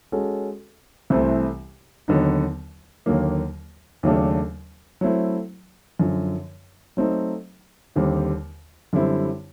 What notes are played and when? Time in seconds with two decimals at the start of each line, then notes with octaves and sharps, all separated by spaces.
0.12 G#3 C#4 F#4 A4
1.10 C2 C3 E3 A3 C4
2.08 D#2 D3 F#3 B3 D#4
3.06 D#2 D3 F#3 A#3
4.03 D#2 C#3 F#3 A3 D4
5.01 F#3 A3 C4 E4
5.99 F#2 D3 F3
6.97 F#3 A3 C4 D#4
7.96 D#2 D3 G3 C4
8.93 F#2 D3 G3 C4 E4